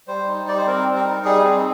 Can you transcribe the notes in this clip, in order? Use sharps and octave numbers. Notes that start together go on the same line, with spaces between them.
G3 C5
D#4
G3 D5
C5
C4 A#4
G3
A#4
D#4
G3 G#4
C4